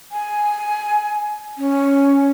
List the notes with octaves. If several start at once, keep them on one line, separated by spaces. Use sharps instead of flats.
G#5
C#4